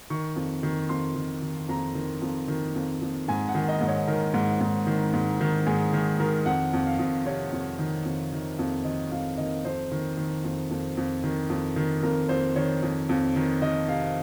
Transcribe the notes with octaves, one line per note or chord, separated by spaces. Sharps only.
D#3 C#6
F2
D#3
F2 C6
D#3
D#3
F2 A#5
D#3
F2
D#3
F2
F2
G#2 G#5
F#5
D#3
D#5
G#2
C#5
D#3 A#4
G#2
G#2
D#3
G#2
D#3
G#2 G#4
D#3 G#4
D#3 A#4
F2 F#5
F2
F5
F2
C3 C#5
F2
D#3
F2
D#3
F2
D#3 D#5
F2 F5
D#3 D#5
F2 C5
D#3
D#3
F2
F2
F2
D#3
F2
D#3
F2 A#4
F2 C5
D#3 C#5
F2
F2
D#3
D#3 D#5
C3 F5